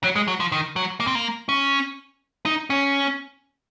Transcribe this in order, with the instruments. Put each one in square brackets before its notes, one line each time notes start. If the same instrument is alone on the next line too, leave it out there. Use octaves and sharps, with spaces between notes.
[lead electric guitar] F#3
G#3
F#3
F3
D#3
F#3
A#3
C4
A#3
C#4
D#4
C#4